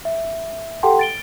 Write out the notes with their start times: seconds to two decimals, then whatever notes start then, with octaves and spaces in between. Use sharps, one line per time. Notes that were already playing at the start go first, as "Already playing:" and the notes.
0.05 E5
0.83 G4 A4 F#5 G5 A5 C6
0.99 A6 D7 G7